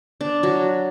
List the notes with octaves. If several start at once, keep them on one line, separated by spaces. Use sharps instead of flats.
D4
F#3